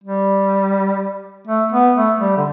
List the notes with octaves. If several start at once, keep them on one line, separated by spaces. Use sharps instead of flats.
G3
A3
B3
A3
G3
D3